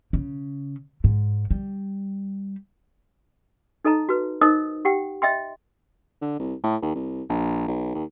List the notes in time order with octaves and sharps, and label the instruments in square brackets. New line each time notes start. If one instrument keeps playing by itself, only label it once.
[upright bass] C#3
G#2
G3
[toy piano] D#4 A4 D#5 A5 A#5
F#4 B4
D#4 A#4 C5 D#5 D#6
G4 F#5 G5
D#5 E5 G5 C6
[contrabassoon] D3
C2
A2
D#2
C2
A#1
B1
D#2